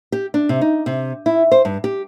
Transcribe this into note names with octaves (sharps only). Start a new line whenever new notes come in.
G4
D4
C3
D#4
C3
E4
C5
G2
G4